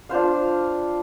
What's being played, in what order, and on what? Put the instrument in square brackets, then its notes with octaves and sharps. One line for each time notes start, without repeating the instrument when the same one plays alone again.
[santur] D4 F4 C5 F5